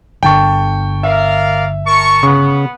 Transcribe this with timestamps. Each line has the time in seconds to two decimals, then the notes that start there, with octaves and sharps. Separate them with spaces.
0.23 G1 D3 G5 A5 C#6
1.03 A#4 D5 E5 F5
1.85 A#4 A5 C#6
2.23 C#3 B3 C#6